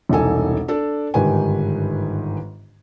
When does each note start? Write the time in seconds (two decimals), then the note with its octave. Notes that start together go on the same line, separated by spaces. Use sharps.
0.09 E1 C2 D#4 A4 G#5
0.68 D4 A4 D5
1.14 G1 G#2 D#3 G4 B4 G#5